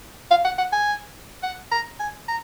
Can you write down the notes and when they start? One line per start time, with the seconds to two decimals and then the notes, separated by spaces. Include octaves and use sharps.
0.31 F5
0.45 F#5
0.58 F#5
0.72 G#5
1.43 F#5
1.72 A#5
2.00 G#5
2.28 A#5